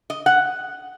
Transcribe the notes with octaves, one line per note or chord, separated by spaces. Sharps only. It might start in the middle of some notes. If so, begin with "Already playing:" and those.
D#5
F#5